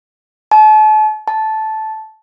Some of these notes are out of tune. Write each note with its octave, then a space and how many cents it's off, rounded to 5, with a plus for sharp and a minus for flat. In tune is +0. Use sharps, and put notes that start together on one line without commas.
A5 -40
A5 -10